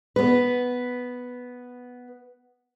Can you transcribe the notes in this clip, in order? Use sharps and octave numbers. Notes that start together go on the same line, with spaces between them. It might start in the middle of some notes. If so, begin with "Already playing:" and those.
B3 B4